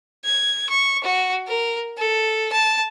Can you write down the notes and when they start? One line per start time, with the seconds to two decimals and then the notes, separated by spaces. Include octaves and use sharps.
0.24 G#6
0.69 C#6
1.03 F#4
1.47 A#4
1.98 A4
2.52 A5